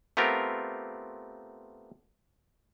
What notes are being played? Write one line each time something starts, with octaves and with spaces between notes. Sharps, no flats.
A3 B3 C4 F4 G4 A#4